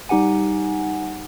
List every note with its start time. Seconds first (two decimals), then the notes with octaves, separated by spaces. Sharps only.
0.09 G3 D#4 G4 F#5 G#5